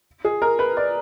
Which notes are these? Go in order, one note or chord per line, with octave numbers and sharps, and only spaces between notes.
G#4
A#4
B4
D5